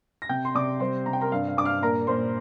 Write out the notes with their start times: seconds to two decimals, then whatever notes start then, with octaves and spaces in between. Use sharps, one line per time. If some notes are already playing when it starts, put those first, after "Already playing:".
0.22 A#6
0.29 C3 G5 G6
0.45 C6
0.55 C3 D5 D6
0.80 G3 C5 C6
1.06 C3 A#5
1.13 G5
1.21 A#4 A#5
1.32 G2 F5
1.48 F5
1.57 G2 D6
1.65 F5 F6
1.82 A#2 A#4 A#5
2.07 A#2 C5 C6